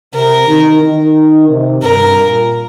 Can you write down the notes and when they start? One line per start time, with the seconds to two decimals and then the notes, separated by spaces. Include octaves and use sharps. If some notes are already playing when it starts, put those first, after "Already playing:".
0.14 C3 A#4
0.47 D#3
0.82 D#3
1.48 C3
1.82 G2 A#4
2.15 A#2